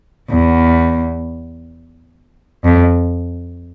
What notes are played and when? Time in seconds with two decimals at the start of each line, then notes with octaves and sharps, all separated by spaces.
0.31 E2
2.65 F2